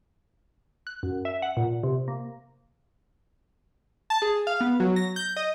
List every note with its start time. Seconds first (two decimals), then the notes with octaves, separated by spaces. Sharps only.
0.87 F#6
1.03 F#2
1.25 E5
1.42 F#5
1.57 A#2
1.83 C3
2.08 A#3
4.10 A5
4.22 G#4
4.47 F5
4.61 B3
4.80 F#3
4.96 A#6
5.16 G6
5.36 D#5